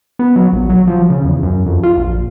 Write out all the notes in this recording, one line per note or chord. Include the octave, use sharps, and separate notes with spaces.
B3
F#3
A#1
F#3
F3
C#3
E2
F#2
F2
F4
A#1